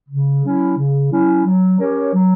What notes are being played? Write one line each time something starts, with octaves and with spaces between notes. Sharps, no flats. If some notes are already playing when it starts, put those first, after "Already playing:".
C#3
F#3 C#4 E4
C#3
F#3 C#4 E4
F#3
C#4 G4 A#4 C#5
F#3